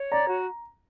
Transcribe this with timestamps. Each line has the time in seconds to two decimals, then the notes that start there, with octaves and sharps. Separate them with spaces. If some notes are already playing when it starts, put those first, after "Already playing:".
Already playing: C#5
0.11 D5 A#5
0.29 F#4